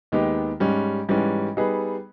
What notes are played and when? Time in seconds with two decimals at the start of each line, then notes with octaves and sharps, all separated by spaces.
0.12 D#2 D#3 G#3 B3 G4
0.60 G#2 G3 C#4
1.09 G#2 E3 G3 C#4
1.57 G3 B3 D#4 G#4 B4